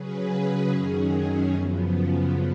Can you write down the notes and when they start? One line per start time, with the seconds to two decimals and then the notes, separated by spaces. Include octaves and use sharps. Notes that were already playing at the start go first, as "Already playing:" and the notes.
Already playing: C#3 F#3 C#4 G#4 B4
0.70 F#2 D#3 F#3 C#4 G#4
1.53 F#2 C#3 F3 B3